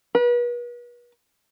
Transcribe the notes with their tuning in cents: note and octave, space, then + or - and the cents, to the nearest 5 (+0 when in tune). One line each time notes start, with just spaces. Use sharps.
B4 -40